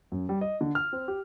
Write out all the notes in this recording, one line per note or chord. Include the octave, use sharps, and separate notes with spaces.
F#2
G3
D#5
D3
F6
C4
G4